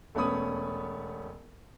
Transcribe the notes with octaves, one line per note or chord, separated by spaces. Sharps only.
E1 A3 B3 C#4 B5 D#6